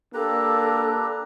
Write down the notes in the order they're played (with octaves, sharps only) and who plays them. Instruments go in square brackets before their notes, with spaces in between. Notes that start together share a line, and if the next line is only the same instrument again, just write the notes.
[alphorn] A#3 [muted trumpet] D4 [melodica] G4 B4 A#5 [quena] A4